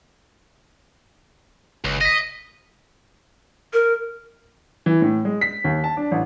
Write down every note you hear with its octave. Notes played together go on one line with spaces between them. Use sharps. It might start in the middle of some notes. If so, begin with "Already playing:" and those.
G1 C#2
D#5 A#6 B6
A#4
E3
A2
G#3
B6
D#2
A5
D4
A1